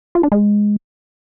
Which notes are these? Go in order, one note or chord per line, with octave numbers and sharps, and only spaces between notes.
F4
D4
G#3